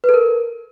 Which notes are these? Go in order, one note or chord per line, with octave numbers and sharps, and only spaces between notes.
B4
A4
A#4